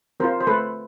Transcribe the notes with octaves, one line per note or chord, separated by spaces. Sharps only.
C4 F4 A#4 C5
C5
A3 A4 B4